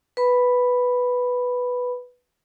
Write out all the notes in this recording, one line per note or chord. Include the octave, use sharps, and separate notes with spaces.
B4 B5